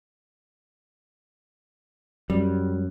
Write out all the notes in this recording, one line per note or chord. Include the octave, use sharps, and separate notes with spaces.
F#2 G3